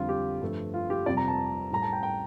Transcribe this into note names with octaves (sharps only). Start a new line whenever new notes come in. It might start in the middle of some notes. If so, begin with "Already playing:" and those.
Already playing: F2 D3 G3 F4
G4
G2 F3 A3
F4
G4
F2 C3 G3 D5
A#5
A5
A2 G3 A#5
A5
G5
G5